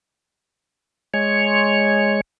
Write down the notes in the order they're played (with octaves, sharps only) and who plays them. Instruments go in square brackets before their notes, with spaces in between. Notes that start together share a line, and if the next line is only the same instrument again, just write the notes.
[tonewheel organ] G#3 C#5